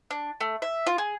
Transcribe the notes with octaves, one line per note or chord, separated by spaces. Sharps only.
D4
A3
E5
F4
G#4